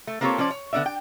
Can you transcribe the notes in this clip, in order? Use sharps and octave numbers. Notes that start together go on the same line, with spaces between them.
A3
A#3 C4 F4 G4 A4 C#5
F3 C#4 C5 D5
C#5
D3 B3 D#4 D5 E5
G5